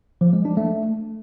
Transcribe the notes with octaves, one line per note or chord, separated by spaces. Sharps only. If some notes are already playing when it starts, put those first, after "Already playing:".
F3
G#3
D4
A3